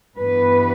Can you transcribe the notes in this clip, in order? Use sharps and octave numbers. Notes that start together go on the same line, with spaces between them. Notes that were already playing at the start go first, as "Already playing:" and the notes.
G2 E3 B3 B4